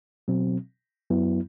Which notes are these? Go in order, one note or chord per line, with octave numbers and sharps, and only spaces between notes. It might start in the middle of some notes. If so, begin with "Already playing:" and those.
B2 F#3 C4
F#2 F#3 B3 E4